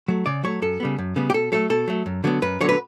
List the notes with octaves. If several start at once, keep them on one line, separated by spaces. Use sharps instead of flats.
F#3 A3
C#3 D5
F#3 A3 C#5
F#2 A4
C#3 G3 B3
F#2
C#3 G3 B3
G4
B2 A4
F#3 A3 A4
B2 A4
F#3 A3
F#2
D3 F#3 B3
F#2 B4
D3 F#3 B3 C#5
B4